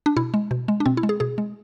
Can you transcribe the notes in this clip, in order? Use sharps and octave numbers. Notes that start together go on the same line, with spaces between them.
D4
B2 E4
G#3
B2
G#3
D4
B2 C4
E4
G#3
G#4
B2 G#4
G#3